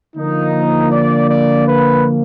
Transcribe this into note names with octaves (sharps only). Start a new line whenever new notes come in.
D3 F3 A#3 D#4
D5
D5
B4